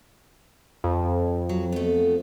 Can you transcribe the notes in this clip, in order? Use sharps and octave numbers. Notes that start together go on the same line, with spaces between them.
F2
F#3
A3 B3